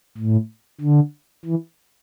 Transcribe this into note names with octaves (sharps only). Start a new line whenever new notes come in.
A2
D3
E3